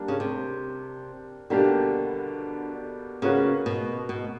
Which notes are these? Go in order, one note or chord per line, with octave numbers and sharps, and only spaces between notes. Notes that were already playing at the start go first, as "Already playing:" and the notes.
Already playing: G3 A#3 D4
C#3
C3
B2 D3 G3 A#3 D4 G4
C#3 A#3 C#4 F#4 B4
B2
B2